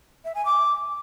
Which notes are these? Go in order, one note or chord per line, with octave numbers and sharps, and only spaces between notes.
E5
G#5
D6